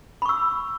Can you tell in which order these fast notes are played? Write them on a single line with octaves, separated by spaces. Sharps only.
B5 C#6 E6